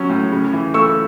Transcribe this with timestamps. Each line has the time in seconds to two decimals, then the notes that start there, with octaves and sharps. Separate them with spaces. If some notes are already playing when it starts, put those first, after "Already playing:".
Already playing: F#3 C#4
0.10 A2
0.32 C#3
0.53 E3
0.74 A3 C#6 E6